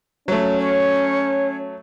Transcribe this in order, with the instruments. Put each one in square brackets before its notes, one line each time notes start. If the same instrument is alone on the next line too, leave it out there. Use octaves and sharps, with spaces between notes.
[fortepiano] F#3 A3 [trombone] C#4
[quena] C#5